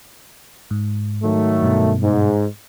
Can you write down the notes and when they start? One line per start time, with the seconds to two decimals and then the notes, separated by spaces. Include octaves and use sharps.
0.71 G#2
1.23 D#3 F#3 A3
1.63 G2 B2
2.01 G#2